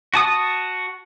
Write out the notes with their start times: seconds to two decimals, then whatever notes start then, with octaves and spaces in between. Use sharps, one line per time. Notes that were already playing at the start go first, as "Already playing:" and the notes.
0.14 F#4 A5 D#6